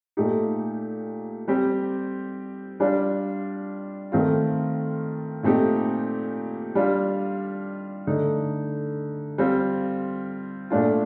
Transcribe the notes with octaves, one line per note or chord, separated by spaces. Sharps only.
A#2 A3 D#4 G4
G3 C4 G4
G3 D4 F4
D#3 A3 C4 F4
A#2 A3 C4 D#4 G4
G3 D4 F4
D3 A3 D#4
G3 C4 F4
A#2 A3 D4 F4